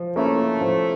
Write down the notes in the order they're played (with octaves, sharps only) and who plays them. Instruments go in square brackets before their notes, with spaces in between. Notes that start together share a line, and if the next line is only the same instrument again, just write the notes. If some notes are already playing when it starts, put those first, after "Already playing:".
Already playing: [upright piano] F3
[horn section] A3 [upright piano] A#3 C#4 E4
[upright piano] F3